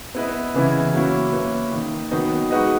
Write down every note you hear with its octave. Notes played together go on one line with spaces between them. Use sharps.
B3 E4 B4 D#5
C#3 E3 B3 E4
F#3 A#3 C#4 E4
A#3 C#4 E4 B4
D#3 A#3 D#4
D#3 F#3 B3 D#4
G#3 D#4 F#4 B4 D#5